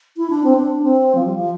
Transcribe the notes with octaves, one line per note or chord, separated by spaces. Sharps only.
E4
D4
C4
D4
C4
F3
G3
F3